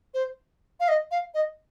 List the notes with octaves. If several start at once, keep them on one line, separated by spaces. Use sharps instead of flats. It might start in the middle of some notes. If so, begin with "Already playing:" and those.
C5
F5
D#5
F5
D#5